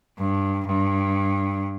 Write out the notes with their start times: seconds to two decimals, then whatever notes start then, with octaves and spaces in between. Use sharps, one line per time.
0.19 G2
0.67 G2